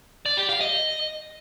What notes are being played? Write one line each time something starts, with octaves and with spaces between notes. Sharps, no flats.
D5
G4
F5
D#5